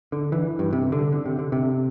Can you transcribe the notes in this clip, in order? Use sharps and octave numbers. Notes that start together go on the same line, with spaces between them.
D3
E3
G2
C3
D3
D3
C3
D3
C3